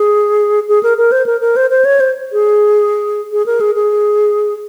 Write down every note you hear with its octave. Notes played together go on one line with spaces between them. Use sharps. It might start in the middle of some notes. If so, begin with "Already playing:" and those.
Already playing: G#4
G#4
A#4
A#4
C5
A#4
A#4
C5
C5
C#5
C5
G#4
G#4
A#4
G#4
G#4